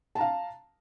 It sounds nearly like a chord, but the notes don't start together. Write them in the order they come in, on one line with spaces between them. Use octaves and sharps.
A5 A#5 F5